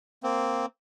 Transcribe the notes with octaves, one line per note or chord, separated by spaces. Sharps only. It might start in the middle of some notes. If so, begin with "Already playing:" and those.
A#3 C4